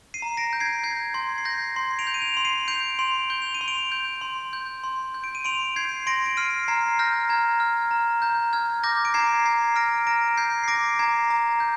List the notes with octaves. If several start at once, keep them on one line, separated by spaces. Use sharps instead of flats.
C7 D#7
A#5
A#6 D7
G6
G#6 C7
G6 G#6
C6 G#6
C7
G6 A#6
C6 G#6 C7
D7 F7
G6
D#7
D7 F7
C6 F7
C7 D#7
G6 D7 F7
C6 D7 F7
G6 G7
F7
D#7
C6
D7 F7
G6
C6
G6
C6
G6
D7
D#7
C6 D7 F7
G6 G#6 C7
C6 A#6 D7
D7
F6 C7 D#7
A#5 G#6 C7
F6 G6 A#6
A#5 G#6
F6
A#5
A#5 G6
F6 G#6
D6 G6 A#6
D7
A#5 G#6 C7
A#5 G#6 C7
F6 A#6 D7
A#5 A#6 D7
G6 G#6 C7
C7
D6 A#6 D7
A#5 G#6 C7
A#5
G6